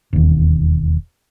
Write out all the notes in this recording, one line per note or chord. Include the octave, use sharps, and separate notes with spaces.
E1 D#2